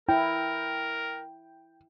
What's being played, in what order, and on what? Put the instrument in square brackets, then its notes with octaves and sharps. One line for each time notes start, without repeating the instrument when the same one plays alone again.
[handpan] E4 [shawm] A#4 [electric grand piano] G5